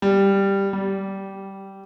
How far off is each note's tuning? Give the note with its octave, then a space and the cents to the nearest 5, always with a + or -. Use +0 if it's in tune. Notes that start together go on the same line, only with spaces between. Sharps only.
G3 +5
G3 -15